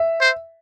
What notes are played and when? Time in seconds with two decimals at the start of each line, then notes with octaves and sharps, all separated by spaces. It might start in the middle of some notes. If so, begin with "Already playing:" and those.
Already playing: E5
0.21 C5